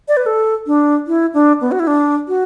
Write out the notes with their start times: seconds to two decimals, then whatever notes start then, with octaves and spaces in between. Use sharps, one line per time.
0.08 D5
0.17 B4
0.26 A4
0.67 D4
1.07 E4
1.34 D4
1.61 B3
1.72 F#4
1.80 E4
1.87 D4
2.28 F#4